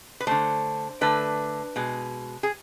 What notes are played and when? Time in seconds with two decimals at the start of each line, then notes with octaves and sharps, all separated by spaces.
0.20 B4
0.27 D3 A3 C5
1.01 D3 A3 B4
1.76 B2 G#3
2.43 G#4